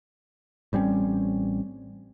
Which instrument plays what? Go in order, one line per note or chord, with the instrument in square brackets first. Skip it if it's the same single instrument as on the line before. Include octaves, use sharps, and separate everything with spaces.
[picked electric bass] A1 G3 C4 C#4